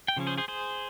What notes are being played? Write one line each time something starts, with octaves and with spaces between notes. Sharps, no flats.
G5
C#3 F3 C#4
G#4 C5
G#4 C5
G#4 C5